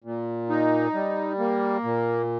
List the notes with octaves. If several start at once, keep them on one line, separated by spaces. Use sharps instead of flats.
A#2
D#4
G3
A#3
A#2